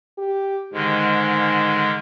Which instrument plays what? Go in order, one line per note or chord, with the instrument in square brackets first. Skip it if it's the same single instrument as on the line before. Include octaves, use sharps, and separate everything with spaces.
[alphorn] G4
[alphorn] G#2 [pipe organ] D3 D#3 G#3